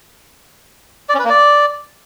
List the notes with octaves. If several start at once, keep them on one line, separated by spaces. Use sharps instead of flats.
D5
C#4
B4
A#3
D5